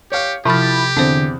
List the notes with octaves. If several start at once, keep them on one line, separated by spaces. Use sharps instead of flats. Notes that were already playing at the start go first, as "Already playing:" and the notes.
G4 C#5 F5
C3 F3 E4 G4 B5 F6 A6
E2 D3 C4 C5